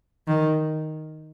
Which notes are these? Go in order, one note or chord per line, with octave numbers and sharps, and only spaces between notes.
D#3